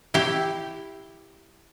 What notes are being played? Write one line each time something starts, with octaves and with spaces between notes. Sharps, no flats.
E4 G4